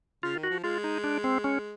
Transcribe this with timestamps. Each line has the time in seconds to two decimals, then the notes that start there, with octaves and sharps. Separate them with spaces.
0.23 C#3 F4
0.36 D#3
0.43 F#4
0.50 F3
0.64 G#3 F4
0.84 D#4
1.04 D4
1.24 C4
1.44 C#4